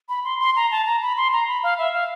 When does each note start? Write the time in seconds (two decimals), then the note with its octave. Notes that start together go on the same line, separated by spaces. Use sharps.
0.09 B5
0.24 C6
0.40 C6
0.56 A#5
0.71 A5
0.86 A#5
1.02 B5
1.17 C6
1.33 A#5
1.47 B5
1.63 F5
1.78 E5
1.94 F5